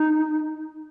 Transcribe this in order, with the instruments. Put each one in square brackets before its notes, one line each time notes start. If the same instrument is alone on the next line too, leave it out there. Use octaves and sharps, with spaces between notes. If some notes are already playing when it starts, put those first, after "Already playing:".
Already playing: [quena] D#4